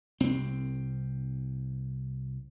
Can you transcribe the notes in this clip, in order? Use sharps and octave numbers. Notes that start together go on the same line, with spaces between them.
C2 C4